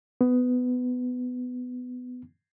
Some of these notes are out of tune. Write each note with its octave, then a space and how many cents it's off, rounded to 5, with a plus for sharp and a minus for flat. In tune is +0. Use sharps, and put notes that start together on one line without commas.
B3 +15